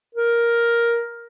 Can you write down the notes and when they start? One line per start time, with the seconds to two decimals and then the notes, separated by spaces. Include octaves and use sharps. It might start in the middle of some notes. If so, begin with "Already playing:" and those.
0.15 A#4